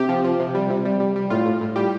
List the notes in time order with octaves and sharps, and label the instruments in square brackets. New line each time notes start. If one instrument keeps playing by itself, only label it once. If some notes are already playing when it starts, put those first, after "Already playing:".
Already playing: [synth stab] C3 G4
F3
F3
C3
G3
C3
G3
G3
G3
A2 F4
A2
A2
G3 G4